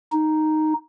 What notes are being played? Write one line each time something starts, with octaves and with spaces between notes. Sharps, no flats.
D#4